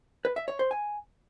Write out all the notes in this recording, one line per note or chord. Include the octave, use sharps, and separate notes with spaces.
B4
E5
C#5
C5
G#5